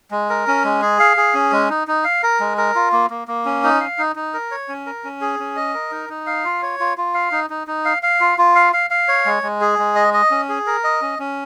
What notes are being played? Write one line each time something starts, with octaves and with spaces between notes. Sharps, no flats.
G#3
A#4
C#4
G#3
G#4
F5
G#4
C#4
G#3
D#4
D#4
F5
A#4
G#3
A#4
F4
A#3
A#3
A#3
C#4
D#4
F5
D#4
D#4
A#4
C#5
C#4
A#4
C#4
G#4
C#4
D#5
A#4
D#4
D#4
F5
F4
C#5
F4
F4
F5
D#4
D#4
D#4
F5
F5
F4
F4
F5
F5
F5
C#5
G#3
G#3
G#4
G#3
D#5
D#5
C#4
G#4
A#4
D#5
C#4
C#4